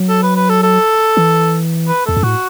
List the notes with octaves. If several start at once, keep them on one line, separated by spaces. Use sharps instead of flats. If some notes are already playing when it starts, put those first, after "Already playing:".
Already playing: F#3
A4
B4
B4
A4
A4
E3
B4
E2 A4
F#2
A2 F#4